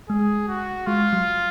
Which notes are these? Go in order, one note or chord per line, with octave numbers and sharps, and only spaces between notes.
G#3 G#4
F#4
G#3 F4
F#3